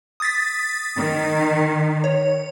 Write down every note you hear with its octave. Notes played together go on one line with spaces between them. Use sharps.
D#6 A6 B6
D#3
C#5